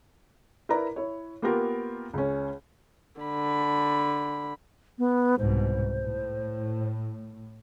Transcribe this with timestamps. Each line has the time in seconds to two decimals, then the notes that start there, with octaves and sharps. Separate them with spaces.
0.69 E4 A#4 B4 D5 A#5
0.96 E4 C#5
1.42 A#3 B3 F4 G4 A#4
2.13 C#2 C#4
3.21 D3 B5
4.98 B3
5.39 C2 G#2 B2 C5
6.03 A2